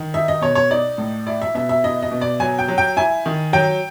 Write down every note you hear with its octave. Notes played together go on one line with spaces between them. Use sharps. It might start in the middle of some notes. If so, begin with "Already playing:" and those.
Already playing: D#3
D#4 E5
D#5
B2 C#5
C#5
D#4 D5
A2
E4 D5
E5
B2 E5
E5
E4 D#5
D#5
B2
D5
F#3 G#5
G5
F#3
G5
E4 G#5
D#3
F#3 G5